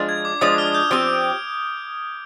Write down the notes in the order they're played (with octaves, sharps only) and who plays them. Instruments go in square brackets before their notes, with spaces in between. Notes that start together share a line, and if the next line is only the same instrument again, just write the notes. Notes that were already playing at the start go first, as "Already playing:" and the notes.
Already playing: [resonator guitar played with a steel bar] F3 G#3 D4
[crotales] G#6
D6
[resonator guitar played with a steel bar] F3 G#3 D4 [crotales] D#6
[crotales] F6
G6
[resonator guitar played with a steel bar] F3 C4 G4 [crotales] D7